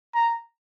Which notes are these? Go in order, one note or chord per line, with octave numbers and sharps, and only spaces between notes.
A#5